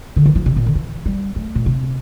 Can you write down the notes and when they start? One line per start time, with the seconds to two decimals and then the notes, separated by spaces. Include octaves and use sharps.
0.16 D3
0.26 E3
0.36 F3
0.46 C3
0.56 A#2
0.66 D3
0.75 E3
1.06 G3
1.36 A3
1.55 A#2
1.66 C3